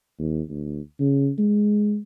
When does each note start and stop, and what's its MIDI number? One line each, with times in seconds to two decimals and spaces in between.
0.19 0.41 39
0.49 0.80 38
1.00 1.31 49
1.38 1.99 56